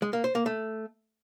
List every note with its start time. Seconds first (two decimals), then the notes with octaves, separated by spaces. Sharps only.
0.02 G#3
0.13 A#3
0.24 C5
0.35 A#3
0.46 A3